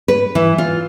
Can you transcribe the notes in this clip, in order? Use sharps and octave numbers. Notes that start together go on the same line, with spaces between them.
B4
E3
F4